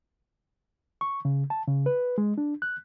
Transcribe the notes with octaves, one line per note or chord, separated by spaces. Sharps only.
C#6
C#3
A5
C#3
B4
G#3
D4
F#6